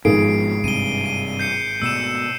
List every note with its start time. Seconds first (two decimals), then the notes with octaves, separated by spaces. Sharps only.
0.05 G#1 B2 F3 G#4 C7 D7
0.64 G2 C3 E3 D#7 G7
1.06 D#7
1.39 G6 C7 C#7
1.82 B2 A3 E6 C#7 E7